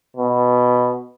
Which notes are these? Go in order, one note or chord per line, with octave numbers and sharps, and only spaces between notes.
B2